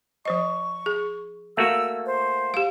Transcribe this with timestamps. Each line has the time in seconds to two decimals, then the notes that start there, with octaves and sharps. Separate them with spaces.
0.25 F3 C5 D#5 C#6
0.86 G#4
1.57 A3 A#3 F#4 E6
2.06 C5
2.54 G4 F5